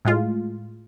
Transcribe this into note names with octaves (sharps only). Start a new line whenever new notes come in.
A2 G#3 F4